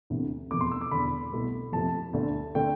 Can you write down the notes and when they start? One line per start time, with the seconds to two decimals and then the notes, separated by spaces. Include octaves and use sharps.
0.10 D2 C3 E3 A3
0.51 F1 E2 B2 A3 D6
0.61 C6
0.71 E6
0.81 D6
0.91 E1 E2 D3 B5
1.32 C2 B2 A3
1.73 F2 C3 F3 A3 A5
2.13 D2 D3 A3
2.55 D3 A3 G5